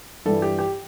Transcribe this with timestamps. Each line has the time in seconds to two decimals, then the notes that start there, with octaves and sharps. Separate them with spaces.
0.26 G2 E3 G3 A4
0.42 G4
0.59 G4